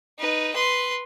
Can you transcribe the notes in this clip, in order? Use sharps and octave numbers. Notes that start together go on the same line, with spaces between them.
D#4 B4
B4 C6